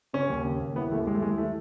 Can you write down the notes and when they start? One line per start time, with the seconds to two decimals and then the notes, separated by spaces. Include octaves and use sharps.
0.13 C#3 C#4
0.30 D#2
0.45 C#3
0.60 D#2
0.76 E3 B3
0.91 D#2 A3
1.07 D#2 G#3
1.14 A3
1.22 E3 G#3
1.38 E3 A3